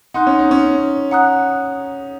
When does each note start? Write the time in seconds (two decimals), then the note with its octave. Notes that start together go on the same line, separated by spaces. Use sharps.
0.14 D#4 F#5 C6 F#6
0.27 C#4
0.39 D#4
0.51 C#4
1.11 F#5 A#5 D#6 F#6